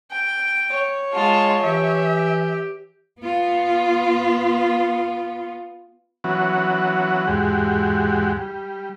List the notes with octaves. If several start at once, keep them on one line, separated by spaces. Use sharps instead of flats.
G5
C#5
G#3 F4 A5
E3 G4 E5
B3 F4
E3 F#3 B3 C#4 F#4
E2 G#2 G#3 F#4 G4
G3